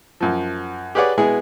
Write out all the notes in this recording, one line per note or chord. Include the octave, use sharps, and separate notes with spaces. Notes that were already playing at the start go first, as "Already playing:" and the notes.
F#2 F3
G4 G#4 B4 C#5 D5 F#5
B2 G#3 B3 E4 G#4